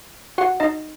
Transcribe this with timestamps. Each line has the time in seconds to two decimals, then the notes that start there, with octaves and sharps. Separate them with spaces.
0.38 F#4 F#5
0.60 D#4 D#5